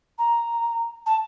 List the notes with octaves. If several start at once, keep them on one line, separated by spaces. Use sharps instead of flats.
A#5
A5